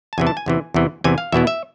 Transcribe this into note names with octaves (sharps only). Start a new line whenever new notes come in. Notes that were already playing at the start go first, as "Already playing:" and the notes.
A5
E2 C3 E3 G#5
A5
G#5
E2 C3 E3
E2 C3 E3
E2 C3 E3 G#5
F5
E2 B2 B3 E4 E5
E5